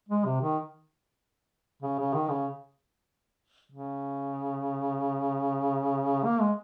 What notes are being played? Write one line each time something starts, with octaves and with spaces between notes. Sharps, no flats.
G#3
C3
D#3
C#3
C#3
D#3
C#3
C#3
A#3
G#3